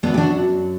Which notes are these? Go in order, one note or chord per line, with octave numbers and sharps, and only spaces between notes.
F#2 F#3 B3 D4
G4
D4 F#4